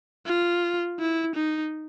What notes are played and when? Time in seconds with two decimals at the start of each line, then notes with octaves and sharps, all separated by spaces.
0.26 F4
0.99 E4
1.35 D#4